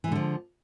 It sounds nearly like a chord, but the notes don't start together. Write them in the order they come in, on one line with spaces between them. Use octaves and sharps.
E3 G#3 D3 F3